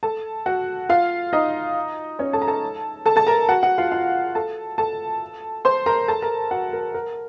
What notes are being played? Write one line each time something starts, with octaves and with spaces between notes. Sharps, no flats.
A4 A5
F#4 F#5
F4 F5
D#4 D#5
C#4 C#5
A4 A5
A#5
A4 A5
A4 A5
A4 A5
A#4 A#5
F#4 F#5
F#4 F#5
F4 F5
F4 F5
A4 A5
A4 A5
C5 C6
A#4 A#5
A4 A5
A#4 A#5
F#4 F#5
A#4
A#4